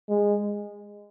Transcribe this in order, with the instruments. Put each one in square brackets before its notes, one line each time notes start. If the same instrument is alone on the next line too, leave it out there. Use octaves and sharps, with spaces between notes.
[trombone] G#3